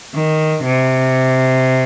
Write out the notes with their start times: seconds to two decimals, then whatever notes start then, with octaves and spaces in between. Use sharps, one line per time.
0.15 D#3
0.64 C3